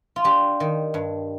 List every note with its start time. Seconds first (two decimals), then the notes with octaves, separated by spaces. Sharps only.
0.16 F4
0.24 D4 G4
0.60 D#3
0.94 G2